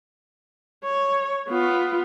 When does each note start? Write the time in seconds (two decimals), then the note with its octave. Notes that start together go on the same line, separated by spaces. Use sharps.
0.84 C#5
1.49 B3 F4